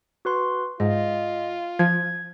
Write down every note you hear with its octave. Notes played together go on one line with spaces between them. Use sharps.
F#4 B4 C6
G#2 F4 D#5
F3 G#6